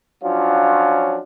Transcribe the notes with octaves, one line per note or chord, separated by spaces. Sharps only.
F3 F#3 C#4 D4 F4